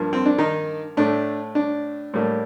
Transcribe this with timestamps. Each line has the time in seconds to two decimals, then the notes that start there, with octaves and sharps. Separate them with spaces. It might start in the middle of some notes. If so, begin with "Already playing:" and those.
Already playing: G2 F3 A#3
0.13 C4
0.26 D4
0.38 D#3 D#4
0.97 A2 A3 D4
1.55 D4
2.14 A2 G3 A#3